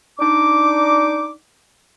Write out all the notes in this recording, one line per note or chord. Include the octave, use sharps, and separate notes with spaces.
D4 D#4 D6